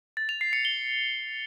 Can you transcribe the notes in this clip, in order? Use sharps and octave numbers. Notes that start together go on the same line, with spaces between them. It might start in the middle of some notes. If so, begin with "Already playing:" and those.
A6
F7
C7
C#7
G7